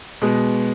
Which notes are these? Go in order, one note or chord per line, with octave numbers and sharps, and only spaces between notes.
B2 G#3 B3